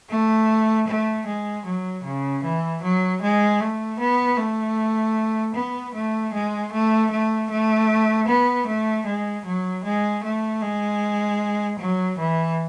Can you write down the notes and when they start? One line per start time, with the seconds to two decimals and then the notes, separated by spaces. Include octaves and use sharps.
0.10 A3
0.87 A3
1.26 G#3
1.65 F#3
2.04 C#3
2.43 E3
2.82 F#3
3.21 G#3
3.60 A3
3.99 B3
4.38 A3
5.55 B3
5.94 A3
6.33 G#3
6.72 A3
7.11 A3
7.50 A3
8.28 B3
8.67 A3
9.06 G#3
9.45 F#3
9.84 G#3
10.23 A3
10.62 G#3
11.79 F#3
12.18 E3